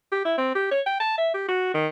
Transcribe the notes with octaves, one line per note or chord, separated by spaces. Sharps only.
G4
E4
C4
G4
C#5
G5
A5
E5
G4
F#4
D#3